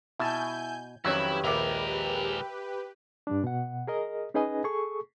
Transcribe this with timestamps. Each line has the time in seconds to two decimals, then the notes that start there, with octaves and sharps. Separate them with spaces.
0.20 B2 E4 G#5 A5 G6
1.05 F2 D#3 F#3 C#4 E4 G4 B4 E6
1.44 A#1 D#2 G#3 A#4 E5 D6
3.27 G2 G3 D4
3.44 B2 F#5
3.87 G#4 A#4 D#5
4.34 C#4 D#4 G#4 B4 D#5 G#5
4.64 G#4 A4 C#6